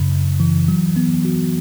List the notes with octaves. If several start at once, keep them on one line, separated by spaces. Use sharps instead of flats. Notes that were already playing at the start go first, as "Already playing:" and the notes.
Already playing: F#2 C#3
F#2
E3
F#3
B3
F#4